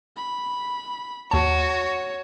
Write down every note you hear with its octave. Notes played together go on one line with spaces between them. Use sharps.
B5
D#2 F#4 C#5 A5